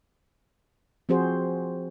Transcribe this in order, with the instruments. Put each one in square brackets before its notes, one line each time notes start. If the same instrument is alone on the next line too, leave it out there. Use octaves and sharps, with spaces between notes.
[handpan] F3 C4 F#4 G#4 C5